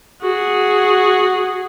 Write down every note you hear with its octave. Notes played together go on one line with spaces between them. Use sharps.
F#4 G#4